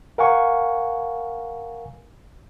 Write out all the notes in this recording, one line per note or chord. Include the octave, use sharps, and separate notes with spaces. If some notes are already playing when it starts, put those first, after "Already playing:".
A#4 F5 F#5 G#5 C#6